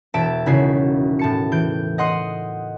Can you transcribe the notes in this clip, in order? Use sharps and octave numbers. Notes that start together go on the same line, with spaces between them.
E1 E5 A5 D7
G#1 C#3 E4 F#4 C7
A2 A5 C#7
E3 G6 D7
D#5 F#5 C6 D#6